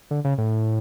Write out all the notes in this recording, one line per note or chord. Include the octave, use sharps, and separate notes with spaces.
D3
C#3
A2